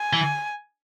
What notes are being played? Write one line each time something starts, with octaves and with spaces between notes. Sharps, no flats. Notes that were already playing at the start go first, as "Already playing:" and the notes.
Already playing: G#5
E3